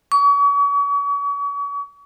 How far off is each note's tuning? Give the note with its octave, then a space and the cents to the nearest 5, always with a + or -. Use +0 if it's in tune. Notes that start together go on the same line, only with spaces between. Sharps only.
C#6 +40